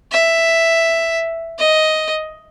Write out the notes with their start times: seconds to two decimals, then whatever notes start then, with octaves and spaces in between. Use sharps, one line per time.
0.12 E5
1.58 D#5